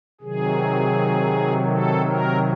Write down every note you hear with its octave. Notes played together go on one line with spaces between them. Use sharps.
C3 D#3 F#3 G#4
A4
A#4